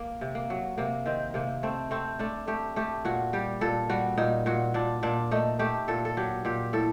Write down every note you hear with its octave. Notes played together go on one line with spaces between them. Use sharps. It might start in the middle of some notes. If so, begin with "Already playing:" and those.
Already playing: A#3
C3
A#3
F#3
C3 A#3
D#3 C4
C3 A#3
A3 C4
A3 C4
A3 D4
A3 G4
A3 G4
A#2 F#4
G3 G4
A#2 A4
G3 F#4
A#2 D#4
A#2 F#4
A#2 D4
A#2 D4
A3 D#4
A3 G4
A#2 A4
A4
F#3 G4
A#2 G4
A2 A4